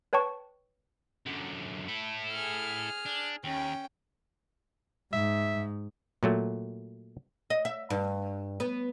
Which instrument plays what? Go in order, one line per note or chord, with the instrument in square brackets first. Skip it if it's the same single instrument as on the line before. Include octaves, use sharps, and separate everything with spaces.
[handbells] B4 C#5 G5 A5 C#6
[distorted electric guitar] F#2 D3
E4 A4
[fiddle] G#4 F6
[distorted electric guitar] D4
[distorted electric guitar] D#2 [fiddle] C#4 G5
[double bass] G#2 [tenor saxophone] E5
[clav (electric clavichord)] A#2 F#3 A3
[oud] D#5
E5
G2
B3